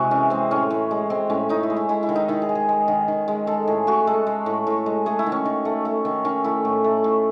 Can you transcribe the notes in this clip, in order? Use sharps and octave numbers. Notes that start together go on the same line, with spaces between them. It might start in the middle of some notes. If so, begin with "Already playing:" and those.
Already playing: C3 G#3 E4 F#4 G#4
E3 C#4
G#3 C4
A2 C#4
A2
G#3
G#3 C4
A2 C#4
A2 D#4
E4
G#3
E4
G#3 E4
E4
D#3
D#4
D#3 E4
G#4
G#3
G#4
G#3
D#3
D#3
G#3
G#3 A4
A2 G#4
A2 F#4
G#3 A4
G#3
A2
A2
G#3
A3 G#4
E4
D#3
C#4
D#3
A3
A3
D#3
D#3 C#4
A3 E4
A2
A3
A2